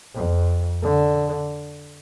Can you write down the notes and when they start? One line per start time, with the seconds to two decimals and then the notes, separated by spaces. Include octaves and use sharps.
0.14 F2
0.83 D3